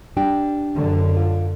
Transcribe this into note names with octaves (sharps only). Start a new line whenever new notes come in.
G3 D4 G5
F#2 D3
F4